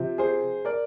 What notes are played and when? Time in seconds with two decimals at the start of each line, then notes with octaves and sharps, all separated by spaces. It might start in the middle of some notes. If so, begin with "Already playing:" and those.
Already playing: C3 F3 C4
0.18 G#4 C5
0.65 A#4 D5